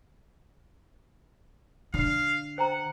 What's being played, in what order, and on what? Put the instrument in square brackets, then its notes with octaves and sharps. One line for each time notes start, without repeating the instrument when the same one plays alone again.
[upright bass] D3 [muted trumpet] F5
[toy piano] C5 G5 A#5 [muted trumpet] F#5